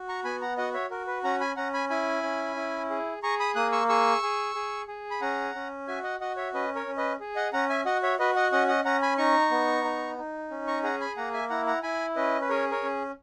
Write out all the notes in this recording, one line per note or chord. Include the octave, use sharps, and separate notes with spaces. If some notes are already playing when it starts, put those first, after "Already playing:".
Already playing: F#4
A#5 C#6
B3 G#5 B5
F#5 A#5
F#4 D#5 F#5
C#5 E5
F#4 A#4
B4
C#4 F#5 A#5
G#5 B5
C#4 F#5 A#5
G#5 B5
E4 G#5 B5
C#4
E4
G#4
G#4 A#5 C#6
B5 D#6
A#3 D#6 F#6
C#6 E6
G#4 C#6 E6
G#4
G#4
G#4
B5
C#4 F#5 A#5
C#4
F#4 E5 G#5
D#5 F#5
F#4 D#5 F#5
C#5 E5
C#4 B4 D#5
A#4 C#5
C#4
B4 D#5
G#4
D#5 F#5
C#4 F#5 A#5
E5 G#5
F#4 D#5 F#5
C#5 E5
F#4 B4 D#5
D#5 F#5
C#4 D#5 F#5
D#5 F#5
C#4 F#5 A#5
G#5 B5
D#4 A#5 C#6
B3
D#4
D#4
C#4
A#5 C#6
G#4 F#5 A#5
G#5 B5
A#3 F#5 A#5
E5 G#5
E4 F#5 A#5
F#5 A#5
E4 G#5 B5
C#4 B4 D#5
B4
G#4 A#4 C#5
A#4 C#5
C#4